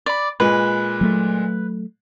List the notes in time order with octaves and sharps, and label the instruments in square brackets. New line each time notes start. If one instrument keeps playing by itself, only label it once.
[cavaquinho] D5 B5
[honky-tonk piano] A#2 G#3 [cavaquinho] B4
[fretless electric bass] F#3 A3